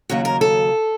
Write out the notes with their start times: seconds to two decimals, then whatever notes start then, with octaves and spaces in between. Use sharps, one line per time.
0.09 D#2 C#3 F#3 F#4
0.25 A#4
0.41 A4